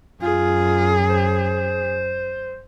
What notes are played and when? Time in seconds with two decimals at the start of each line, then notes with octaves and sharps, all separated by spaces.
0.22 F#2 F4 G#4
1.10 C5